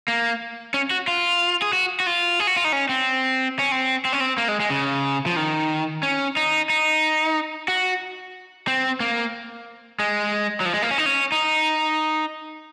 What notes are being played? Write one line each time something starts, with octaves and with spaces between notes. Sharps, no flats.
A#3
C#4
F#4
F4
G#4
F#4
F#4
F4
G#4
F#4
F4
D#4
C#4
C4
C#4
C4
C4
C#4
C4
A#3
G#3
G#3
C#3
F3
D#3
C#4
D#4
D#4
F#4
C4
A#3
G#3
F#3
F3
G#3
A#3
C#4
D#4
C#4
D#4